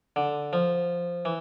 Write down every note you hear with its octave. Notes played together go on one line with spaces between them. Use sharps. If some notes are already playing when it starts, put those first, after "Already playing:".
D3
F3
E3